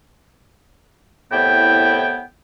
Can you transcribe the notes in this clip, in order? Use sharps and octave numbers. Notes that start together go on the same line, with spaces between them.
C2 A2 B3 E4 G5